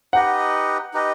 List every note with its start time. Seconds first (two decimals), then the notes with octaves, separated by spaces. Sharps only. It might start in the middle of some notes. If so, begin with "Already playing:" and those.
0.13 D#4 G4 B4 D#5 F#5
0.94 D#4 G4 B4 D#5